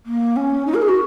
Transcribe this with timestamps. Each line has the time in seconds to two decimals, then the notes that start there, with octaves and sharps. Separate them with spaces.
0.06 A#3
0.36 C#4
0.66 D#4
0.74 A#4
0.82 G#4
0.88 F#4